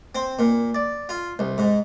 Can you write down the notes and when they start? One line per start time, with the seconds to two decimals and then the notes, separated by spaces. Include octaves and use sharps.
0.15 C4
0.39 A#2
0.75 D5
1.09 F4
1.39 C2
1.58 G#2